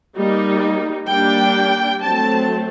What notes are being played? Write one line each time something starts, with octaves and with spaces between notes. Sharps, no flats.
G3 A#3 D#4
G3 A#3 D4 G5
F#3 A3 C4 A5